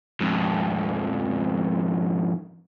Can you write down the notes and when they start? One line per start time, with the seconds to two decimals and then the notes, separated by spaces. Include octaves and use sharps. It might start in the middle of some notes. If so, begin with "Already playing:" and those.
0.20 F2 G#2